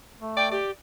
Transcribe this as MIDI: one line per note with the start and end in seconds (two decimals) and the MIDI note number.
0.20 0.57 57
0.37 0.49 74
0.37 0.50 79
0.52 0.71 67
0.52 0.71 74